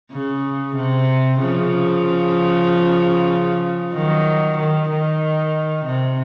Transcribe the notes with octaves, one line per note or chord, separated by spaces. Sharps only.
C#3
C3
C#3 F3
D#3 F#3
D#3
D#3
C3